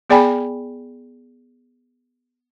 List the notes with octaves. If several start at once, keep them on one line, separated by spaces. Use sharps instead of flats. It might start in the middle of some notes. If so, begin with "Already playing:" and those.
B3 G#4 D5 G5 G#5 B5